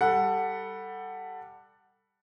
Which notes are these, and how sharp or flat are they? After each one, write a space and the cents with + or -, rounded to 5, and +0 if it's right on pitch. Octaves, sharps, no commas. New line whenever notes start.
G3 +0 A4 +20 F#5 +0